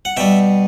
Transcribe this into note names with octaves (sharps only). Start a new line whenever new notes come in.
F#5
B2 G3 E5 G5